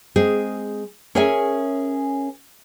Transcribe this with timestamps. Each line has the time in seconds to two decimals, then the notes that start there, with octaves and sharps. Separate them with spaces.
0.16 G#3 C4 G#4
1.15 C#4 G#4 A#4 C#5 E5 G#5